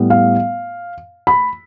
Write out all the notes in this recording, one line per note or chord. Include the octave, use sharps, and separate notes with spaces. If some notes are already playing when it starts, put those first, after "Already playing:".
Already playing: A2 G3 B3
F5
B5